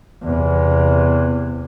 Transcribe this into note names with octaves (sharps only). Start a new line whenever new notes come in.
E2 C3